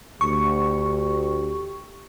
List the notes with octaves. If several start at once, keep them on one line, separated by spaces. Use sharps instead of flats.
D2 G4 C#6